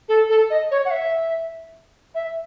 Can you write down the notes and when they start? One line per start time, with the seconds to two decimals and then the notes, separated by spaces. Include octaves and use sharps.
0.09 A4
0.29 A4
0.50 D#5
0.71 C#5
0.85 F#5
0.91 E5
2.15 E5